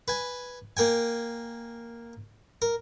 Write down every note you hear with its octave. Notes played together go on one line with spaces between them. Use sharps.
B4 G#5
A#3 A#4 G5 G#5
A#4